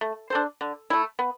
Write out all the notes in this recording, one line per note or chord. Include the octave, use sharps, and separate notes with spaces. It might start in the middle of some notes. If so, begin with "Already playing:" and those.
A3
D4 A4 C5
D3
A3 E4
B3